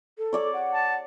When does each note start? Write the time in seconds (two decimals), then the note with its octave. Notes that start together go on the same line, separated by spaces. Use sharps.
0.18 A4
0.33 C#5 D5 D6
0.54 F#5
0.74 A5